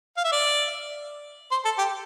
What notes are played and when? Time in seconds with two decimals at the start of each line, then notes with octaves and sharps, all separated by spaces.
0.17 F5
0.24 E5
0.32 D5
1.51 C5
1.65 A4
1.78 G4